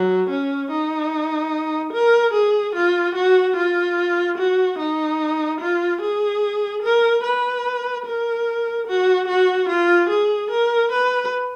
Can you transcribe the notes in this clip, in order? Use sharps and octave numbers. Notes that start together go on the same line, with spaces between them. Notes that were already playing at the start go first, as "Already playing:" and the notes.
Already playing: F#3
C#4
D#4
A#4
G#4
F4
F#4
F4
F#4
D#4
F4
G#4
A#4
B4
A#4
F#4
F#4
F4
G#4
A#4
B4